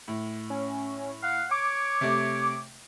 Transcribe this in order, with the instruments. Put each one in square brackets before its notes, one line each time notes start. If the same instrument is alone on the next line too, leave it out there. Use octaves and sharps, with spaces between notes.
[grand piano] A2
[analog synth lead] C#4
[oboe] F5 [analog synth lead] F#5
[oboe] C#5 [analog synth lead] D6
[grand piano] C3 A3